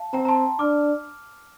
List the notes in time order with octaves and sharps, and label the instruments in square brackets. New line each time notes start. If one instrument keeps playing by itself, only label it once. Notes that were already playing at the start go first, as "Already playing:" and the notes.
Already playing: [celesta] F5 A5
[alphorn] C4 [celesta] G5 A#5
[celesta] A#5
A5 C6
[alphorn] D4 [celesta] D6 F6